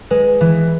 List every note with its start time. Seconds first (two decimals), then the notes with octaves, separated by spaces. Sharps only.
0.10 G#3 B4
0.41 E3